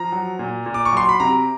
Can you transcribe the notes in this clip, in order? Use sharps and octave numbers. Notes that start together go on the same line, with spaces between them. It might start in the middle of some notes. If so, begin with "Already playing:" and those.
Already playing: F3 A#5
F#3
A#2
A#2
D6
C#6
F#3 C6
B5
C3 A#5